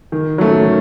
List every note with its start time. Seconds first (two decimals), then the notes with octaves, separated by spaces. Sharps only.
0.12 D#3
0.38 F#3 A3 C#4
0.65 D#3